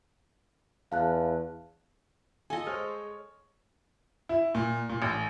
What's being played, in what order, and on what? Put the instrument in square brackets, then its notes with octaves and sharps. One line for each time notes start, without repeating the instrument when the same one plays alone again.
[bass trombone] E2 [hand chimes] F5 A5 F#6
[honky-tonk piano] F4 G#5 [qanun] A4 D#5
[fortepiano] G#3 [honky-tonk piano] C5 [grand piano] C#5 F6
[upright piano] E4
A#2
A#2
A1